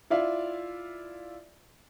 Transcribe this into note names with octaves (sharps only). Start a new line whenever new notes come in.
E4 F4 D5 E5 F5